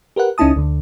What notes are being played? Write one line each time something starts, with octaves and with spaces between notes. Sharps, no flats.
G4 A#4 B4 F#5
C#2 C#4 D#4 E4 A5 D#6
D2 D3